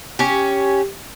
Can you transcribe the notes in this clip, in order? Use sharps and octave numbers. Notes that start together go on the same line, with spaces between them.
C#4 G4